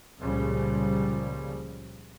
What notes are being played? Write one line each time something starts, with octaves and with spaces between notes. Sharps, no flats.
C#2 A#2 C#3 F3 G3